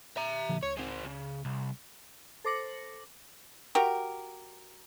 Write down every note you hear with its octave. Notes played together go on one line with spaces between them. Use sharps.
E5 A#5
A#2 D3 F3
C#2 C#5
G#3 C4
C#3
C2
A4 C5 D6 A#6 C#7 F#7
F#4 G4 A#4